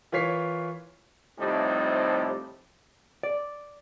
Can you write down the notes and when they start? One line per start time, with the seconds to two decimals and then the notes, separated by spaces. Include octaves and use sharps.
0.12 E3 F4 A#4 C#5 B6 C7
1.40 A2 C3 F3 G3 D#4
3.23 D5